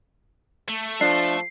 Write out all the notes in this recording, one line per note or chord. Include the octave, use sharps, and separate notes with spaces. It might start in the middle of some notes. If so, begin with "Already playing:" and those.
A3
F3 D4 C7